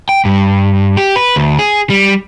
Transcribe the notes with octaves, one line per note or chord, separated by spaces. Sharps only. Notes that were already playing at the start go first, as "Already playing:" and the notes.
G5
G2
G4
B4
D2
G#4
G3